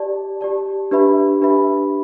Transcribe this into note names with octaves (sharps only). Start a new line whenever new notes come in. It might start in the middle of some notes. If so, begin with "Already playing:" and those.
Already playing: G4 D5 A5
G4 D5 A5
D4 G4 B4 E5 B5
D4 G4 B4 E5 B5